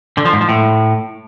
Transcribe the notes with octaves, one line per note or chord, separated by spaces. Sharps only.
D3
F3
G#2
F3
A2